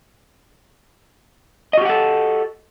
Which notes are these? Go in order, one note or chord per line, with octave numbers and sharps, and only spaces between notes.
F#4 G4 A4 D#5 F#5